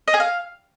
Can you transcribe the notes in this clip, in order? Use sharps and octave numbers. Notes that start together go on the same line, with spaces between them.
D#5
G#4
F5